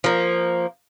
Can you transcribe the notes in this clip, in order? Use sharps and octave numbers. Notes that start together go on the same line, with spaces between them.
F3 A#3